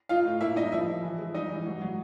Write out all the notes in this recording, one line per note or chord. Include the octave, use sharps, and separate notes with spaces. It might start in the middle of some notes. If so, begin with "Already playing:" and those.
D#4 F4 F5
A2
A#3 E4 E5
G3 D#4 D#5
F3 E4 E5
F3
E3
G#3
G3 D#4 D#5
E3
F#3
F#3